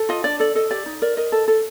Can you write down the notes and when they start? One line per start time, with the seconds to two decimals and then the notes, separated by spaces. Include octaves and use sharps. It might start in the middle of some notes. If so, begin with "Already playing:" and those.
Already playing: A4
0.09 F4 D#5
0.24 D4 D5
0.40 A4 D5
0.55 A4 D#5
0.71 G4 D5
0.86 D#4
1.02 A#4 D5
1.17 A#4 D#5
1.32 A4
1.48 A4